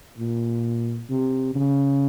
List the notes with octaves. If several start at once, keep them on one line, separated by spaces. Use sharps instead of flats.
A#2
C3
C#3